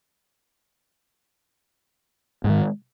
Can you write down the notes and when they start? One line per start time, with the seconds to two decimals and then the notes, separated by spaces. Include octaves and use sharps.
2.44 G#2
2.47 G#3
2.49 D#3